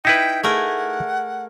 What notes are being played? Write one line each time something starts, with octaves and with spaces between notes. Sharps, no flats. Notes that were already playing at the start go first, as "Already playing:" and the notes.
D#4 E4 B4 G5
A3 G#4 A#4 F#5